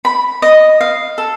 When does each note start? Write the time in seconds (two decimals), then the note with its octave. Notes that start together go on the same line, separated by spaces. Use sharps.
0.05 B5
0.42 D#5
0.81 F5
1.18 A4